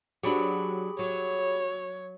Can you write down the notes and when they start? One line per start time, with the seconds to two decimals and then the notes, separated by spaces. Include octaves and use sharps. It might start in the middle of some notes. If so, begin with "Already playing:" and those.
0.23 F#3 D4 G4 G#4 B5
0.99 F#3 C#5